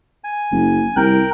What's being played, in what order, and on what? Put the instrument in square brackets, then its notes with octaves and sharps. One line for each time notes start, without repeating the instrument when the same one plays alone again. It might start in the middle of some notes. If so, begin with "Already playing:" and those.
[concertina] G#5
[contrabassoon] F#1
[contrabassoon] C2 [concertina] A#4 G5 F#6